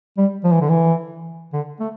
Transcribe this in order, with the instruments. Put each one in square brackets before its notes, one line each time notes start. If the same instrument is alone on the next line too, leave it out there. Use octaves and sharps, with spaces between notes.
[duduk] G3
F3
E3
D3
E3
D3
A3